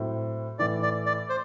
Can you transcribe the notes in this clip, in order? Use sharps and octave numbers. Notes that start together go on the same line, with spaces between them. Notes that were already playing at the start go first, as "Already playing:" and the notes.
Already playing: A2 F#3 C4 E4
A2 E3 A3 D5
D5
D5
C5